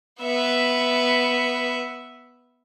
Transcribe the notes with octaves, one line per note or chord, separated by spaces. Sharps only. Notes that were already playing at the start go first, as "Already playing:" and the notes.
B3 E5